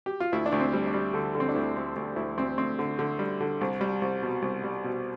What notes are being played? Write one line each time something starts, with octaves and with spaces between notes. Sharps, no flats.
G4
F4
D2 E4
D4
D2
C4
G3
D4
G3
D3 A4
D3
C4
D4
D2 E4
D2
D2
D2 E4
D2 C4
D2 C4
D3
D3
G3
D3
C2
G3
C2
B2
C2
G3
B2